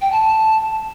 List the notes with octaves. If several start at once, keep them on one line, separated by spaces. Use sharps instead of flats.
G5
A5